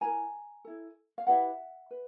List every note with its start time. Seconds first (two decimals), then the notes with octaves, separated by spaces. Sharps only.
0.01 E4 G4 A#4 G#5 A#5
0.65 E4 A4
1.18 F5
1.27 E4 G4 B4 E5 F#5
1.91 B4